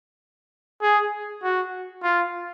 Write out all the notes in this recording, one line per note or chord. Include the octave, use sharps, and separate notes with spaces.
G#4
F#4
F4